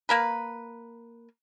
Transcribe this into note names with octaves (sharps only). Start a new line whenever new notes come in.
A#3 A#4 B4